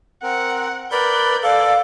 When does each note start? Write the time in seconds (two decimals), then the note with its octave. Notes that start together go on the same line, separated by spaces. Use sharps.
0.23 C4 A#4 F#5
0.92 A#4 B4 D5 B5 G6
1.43 A4 D5 F5